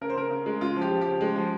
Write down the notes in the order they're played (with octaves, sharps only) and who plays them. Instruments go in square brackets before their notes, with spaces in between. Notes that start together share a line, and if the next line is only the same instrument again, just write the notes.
[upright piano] C#3 A#4
C5
C#3 A#4
C#3
G#3
C#3 F4
F3
G4
F3
C#3 G4
G#3
F3